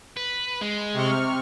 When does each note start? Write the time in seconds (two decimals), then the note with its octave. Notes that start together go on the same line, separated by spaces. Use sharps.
0.17 B4
0.61 G#3
0.94 C3 C#6 F6